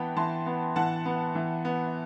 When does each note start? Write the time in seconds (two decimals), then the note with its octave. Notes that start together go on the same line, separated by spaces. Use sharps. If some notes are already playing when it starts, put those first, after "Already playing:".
Already playing: E3 B3 F#5 G5 A5 B5
0.16 E3 A5 C6
0.46 B3
0.76 E3 F#5 A5
1.06 B3
1.35 E3
1.65 B3